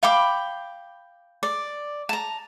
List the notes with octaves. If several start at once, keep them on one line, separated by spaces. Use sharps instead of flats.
F5 G5 B5 D6
D5
A5 A#5